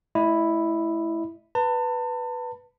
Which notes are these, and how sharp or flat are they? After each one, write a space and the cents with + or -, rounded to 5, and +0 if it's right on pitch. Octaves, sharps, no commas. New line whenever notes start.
A3 -20 E4 +0 D#5 -30
B4 +0 A5 +35